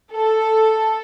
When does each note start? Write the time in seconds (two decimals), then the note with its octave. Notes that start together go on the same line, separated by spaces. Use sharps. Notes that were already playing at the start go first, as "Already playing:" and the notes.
0.12 A4